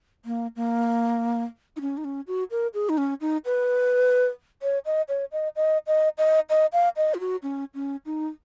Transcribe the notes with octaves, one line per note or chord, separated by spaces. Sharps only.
A#3
A#3
D#4
C#4
D#4
C#4
F#4
A#4
G#4
D#4
C#4
D#4
B4
C#5
D#5
C#5
D#5
D#5
D#5
D#5
D#5
F5
D#5
F4
F#4
C#4
C#4
D#4